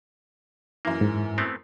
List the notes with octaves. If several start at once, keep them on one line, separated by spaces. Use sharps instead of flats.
F#2 E3 A#3
G#2
A3 B3 C4